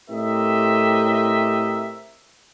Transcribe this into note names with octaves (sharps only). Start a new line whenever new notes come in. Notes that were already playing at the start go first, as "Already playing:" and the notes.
A2 C4 G4 A#4 D#5 E5